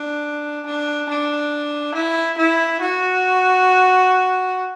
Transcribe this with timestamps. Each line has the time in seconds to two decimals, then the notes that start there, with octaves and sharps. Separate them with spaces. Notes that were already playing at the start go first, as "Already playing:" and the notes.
Already playing: D4
0.66 D4
1.09 D4
1.94 E4
2.38 E4
2.81 F#4